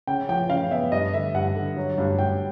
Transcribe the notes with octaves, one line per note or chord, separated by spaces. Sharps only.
C#3 G5
F3 G5
C#3 F5
B3 E5
G2 D#5
D3 E5
G2 F#5
D3
F#3
G2
G2 G5